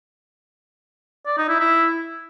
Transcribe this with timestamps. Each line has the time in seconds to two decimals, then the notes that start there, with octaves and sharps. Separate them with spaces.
1.26 D5
1.38 D#4
1.49 E4
1.60 E4